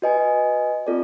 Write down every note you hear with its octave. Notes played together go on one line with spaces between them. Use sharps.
F#4 B4 D#5 G#5
C4 F4 A4 D5